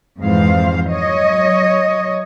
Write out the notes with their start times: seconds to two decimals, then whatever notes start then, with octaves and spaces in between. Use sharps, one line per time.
0.20 F2 G#2 E3 C5 F5
0.88 F#3 C#5 D#5